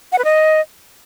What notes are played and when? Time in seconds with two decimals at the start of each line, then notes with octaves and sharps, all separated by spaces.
0.12 F#5
0.18 B4
0.25 D#5